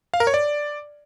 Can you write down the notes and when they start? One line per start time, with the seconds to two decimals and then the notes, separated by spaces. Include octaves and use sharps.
0.14 F5
0.20 A#4
0.27 C#5
0.34 D5